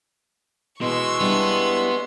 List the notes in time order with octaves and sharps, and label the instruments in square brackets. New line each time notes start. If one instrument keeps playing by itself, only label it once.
[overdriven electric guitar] B2 [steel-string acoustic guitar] E3 [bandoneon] G#3 C6 [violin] C#6 E6
[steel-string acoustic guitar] G3 D4 E4 [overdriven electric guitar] B3